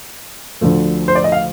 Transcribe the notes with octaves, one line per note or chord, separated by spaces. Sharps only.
D2 D3 F3 A3
C5
D5
D#5
F5